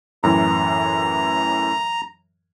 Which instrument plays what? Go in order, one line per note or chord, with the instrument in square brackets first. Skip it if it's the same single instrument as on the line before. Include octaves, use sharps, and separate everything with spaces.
[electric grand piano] F#2 A2 E3 [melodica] A#5